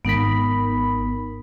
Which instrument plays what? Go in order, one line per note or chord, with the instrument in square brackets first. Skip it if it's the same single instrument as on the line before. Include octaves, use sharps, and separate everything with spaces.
[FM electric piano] G#1 B5 [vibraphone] B3 D#4 A#4